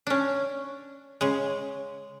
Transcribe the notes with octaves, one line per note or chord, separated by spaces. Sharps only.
C#4 D4
C#3 G#3